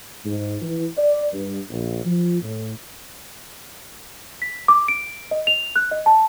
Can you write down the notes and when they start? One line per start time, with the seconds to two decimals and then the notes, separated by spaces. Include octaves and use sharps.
0.25 G#2
0.62 E3
0.97 D5
1.33 G2
1.70 A#1
2.05 F3
2.42 A2
4.42 B6
4.68 D6
4.88 D7
5.31 D#5
5.47 F7
5.76 F#6
5.91 D#5
6.06 A5